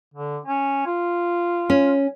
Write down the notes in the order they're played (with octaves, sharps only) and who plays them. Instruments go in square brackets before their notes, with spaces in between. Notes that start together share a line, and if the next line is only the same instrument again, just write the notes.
[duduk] D3
C#4
F4
[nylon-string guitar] C#4